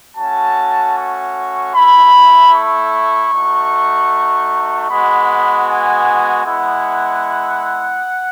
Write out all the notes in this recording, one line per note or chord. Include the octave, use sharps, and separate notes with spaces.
A3 C#4 F#4 A5
C#6
A3 E4 B5
C#6
A3 D#4 F#4
G#3 B3 F#4 B5
G#5
G#3 B3 E4 F#5